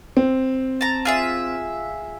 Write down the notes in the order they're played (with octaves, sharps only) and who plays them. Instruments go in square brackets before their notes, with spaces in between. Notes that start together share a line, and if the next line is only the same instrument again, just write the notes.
[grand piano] C4
[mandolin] A5 A#5
F4 G#4 E5